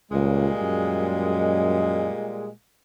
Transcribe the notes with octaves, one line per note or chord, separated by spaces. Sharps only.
C#2 A#2 G3 G#3
F#2